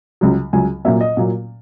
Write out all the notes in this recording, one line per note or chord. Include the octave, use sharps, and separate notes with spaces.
C#2 C#3 F#3
C#2 C#3 F#3 G#5
A#2 F#3 A#3 E5
D#5
A#2 F#3 A#3